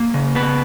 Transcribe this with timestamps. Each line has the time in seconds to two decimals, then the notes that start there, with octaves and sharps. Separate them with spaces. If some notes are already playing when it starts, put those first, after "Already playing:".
Already playing: A#3
0.14 C#3
0.35 B3 B4